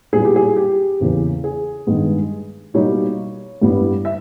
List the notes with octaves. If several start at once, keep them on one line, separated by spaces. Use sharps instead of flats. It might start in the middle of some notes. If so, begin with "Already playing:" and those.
A#2 G3 B3 E4 G#4
G4
G#4
G4
E2 C#3 E3 A#3 E4
G#4
G2 D#3 G#3 B3
B2 G3 A#3 D#4 C#5
G2 G3 B3 E4
E5